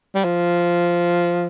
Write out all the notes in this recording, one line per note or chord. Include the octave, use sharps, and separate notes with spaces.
G3
F3